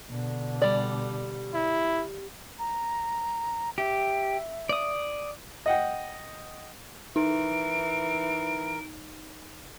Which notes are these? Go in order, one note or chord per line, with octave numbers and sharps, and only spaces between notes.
B2 D3
G3 D5
E4
A#5
G4 E5
D5 D#6
D#5 F#5 G5
E3 D#4 A#4 D7